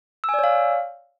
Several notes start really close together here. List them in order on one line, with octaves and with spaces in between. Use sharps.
E6 G#5 D5 C#5 F5